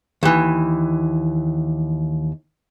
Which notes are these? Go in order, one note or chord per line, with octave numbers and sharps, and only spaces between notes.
D#2 E3